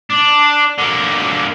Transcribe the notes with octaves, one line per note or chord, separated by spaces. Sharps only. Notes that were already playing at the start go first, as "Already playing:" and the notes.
D4
D3 A#3